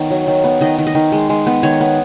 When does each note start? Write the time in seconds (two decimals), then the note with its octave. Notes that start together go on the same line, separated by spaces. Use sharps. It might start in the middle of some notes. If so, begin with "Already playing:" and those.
Already playing: D#3 B3 C#5
0.11 F#3
0.27 D#3
0.44 B3
0.61 D#3 D#5
0.78 D#3
0.87 D#5
0.95 D#3
1.12 G#3
1.29 G#3
1.46 B3
1.63 D#3 C#5
1.81 B3